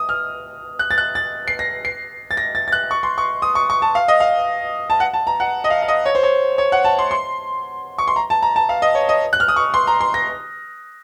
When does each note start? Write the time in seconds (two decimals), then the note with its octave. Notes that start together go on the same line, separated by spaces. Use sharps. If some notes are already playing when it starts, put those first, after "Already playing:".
Already playing: D#6
0.09 F6
0.79 F#6
0.91 A6
0.98 F#6
1.15 A6
1.48 C7
1.59 A#6
1.85 C7
2.31 A6
2.37 A#6
2.55 A6
2.68 A6
2.72 F#6
2.91 C#6
3.03 C6
3.18 C#6
3.42 D#6
3.55 C#6
3.70 C#6
3.82 A5
3.95 F5
4.08 D#5
4.20 F5
4.90 A5
5.00 F#5
5.14 A5
5.27 A#5
5.40 F#5
5.64 D#5
5.70 F5
5.82 F5
5.88 D#5
6.06 C#5
6.15 C5
6.23 C#5
6.58 C#5
6.72 F#5
6.85 A5
6.99 C6
7.11 C6
7.98 C#6
8.08 C6
8.16 A#5
8.30 A5
8.43 A#5
8.56 A5
8.69 F5
8.82 D#5
8.95 C#5
9.09 D#5
9.33 F#6
9.40 F6
9.48 D#6
9.56 C#6
9.74 C6
9.87 A#5
10.01 C6
10.14 A#6